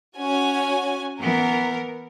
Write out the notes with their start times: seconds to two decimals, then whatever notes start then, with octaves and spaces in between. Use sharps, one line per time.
0.17 C#4 F#4 G#5
1.20 E3 B3 A#4